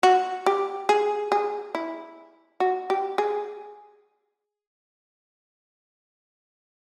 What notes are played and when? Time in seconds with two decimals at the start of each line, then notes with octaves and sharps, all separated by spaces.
0.03 F#4
0.46 G4
0.89 G#4
1.32 G#4
1.75 E4
2.60 F#4
2.90 G4
3.18 G#4